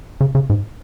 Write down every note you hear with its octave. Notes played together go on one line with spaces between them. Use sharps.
C#3
C#3
G#2